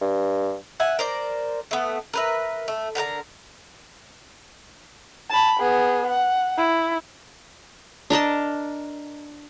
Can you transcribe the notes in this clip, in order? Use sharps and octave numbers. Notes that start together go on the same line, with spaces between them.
G2
E5 F#5 G#5
A#4 C5 D5
A3 B3
A#4 B4 E5
A3
D3 A#4 B4 A#5
A5 B5
B3 G#4
F#5
E4
D4 A#4 D#5 A5